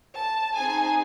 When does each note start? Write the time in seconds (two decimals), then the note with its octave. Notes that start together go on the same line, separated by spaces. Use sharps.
0.15 A5
0.54 C4 D#4 G#4 G#5